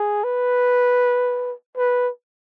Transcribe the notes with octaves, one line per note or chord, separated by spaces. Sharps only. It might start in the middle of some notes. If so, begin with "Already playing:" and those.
Already playing: G#4
B4
B4